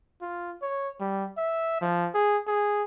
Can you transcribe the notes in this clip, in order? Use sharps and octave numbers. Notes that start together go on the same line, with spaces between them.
F4
C#5
G3
E5
F3
G#4
G#4